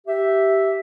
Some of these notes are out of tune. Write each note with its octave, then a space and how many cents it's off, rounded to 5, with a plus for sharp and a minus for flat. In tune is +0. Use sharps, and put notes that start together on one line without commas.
G4 -15 E5 +0